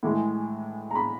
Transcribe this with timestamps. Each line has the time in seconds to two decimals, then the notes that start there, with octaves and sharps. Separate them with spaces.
0.03 A2 E3 G#3
0.91 A#5
0.95 B5